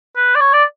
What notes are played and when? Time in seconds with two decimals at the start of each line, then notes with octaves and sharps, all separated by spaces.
0.16 B4
0.35 D5
0.40 C#5
0.53 D5